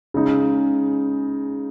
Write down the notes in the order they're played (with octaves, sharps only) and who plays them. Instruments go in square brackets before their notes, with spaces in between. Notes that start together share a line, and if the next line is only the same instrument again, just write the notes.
[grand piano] C#3 G#3 D#4